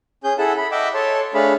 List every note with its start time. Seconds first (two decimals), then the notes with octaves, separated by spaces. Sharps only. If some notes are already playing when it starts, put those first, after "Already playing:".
0.24 C#4 G#4 G6
0.38 E4 G#4 A4 F#5 A5
0.58 B5
0.72 D#5 E5 F#5 G5 D6 E6
0.94 A4 C#5 A5 C6
1.34 A3 D4 G#4 C#5 F5 B5